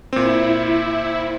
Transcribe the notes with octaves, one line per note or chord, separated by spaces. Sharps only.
A#2 C4 E4